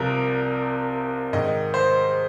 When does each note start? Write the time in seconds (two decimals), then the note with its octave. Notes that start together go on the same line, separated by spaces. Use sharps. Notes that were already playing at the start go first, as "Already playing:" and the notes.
Already playing: C2 C3 F3 A#4
1.33 G#2 D#3 D#5
1.74 C5